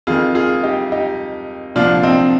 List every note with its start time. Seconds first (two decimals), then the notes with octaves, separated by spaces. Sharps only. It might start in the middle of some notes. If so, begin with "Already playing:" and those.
0.07 F2 D#3 F4 G#4
0.35 F4 G#4
0.63 D#4 G4
0.92 D#4 G4
1.75 C2 A#2 F3 D4 F4
2.03 C4 D#4